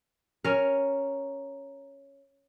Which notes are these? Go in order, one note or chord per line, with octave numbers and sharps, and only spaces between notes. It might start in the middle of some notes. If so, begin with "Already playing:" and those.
C#4 A#4